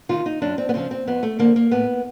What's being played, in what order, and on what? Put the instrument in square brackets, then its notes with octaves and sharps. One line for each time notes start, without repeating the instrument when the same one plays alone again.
[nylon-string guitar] C3 D#3 F4
D#4
F#2 D4
C4
B3
C#3 F3 C4
C4
F2 B3
A3
D3 F3 A#3
A#3
A2 B3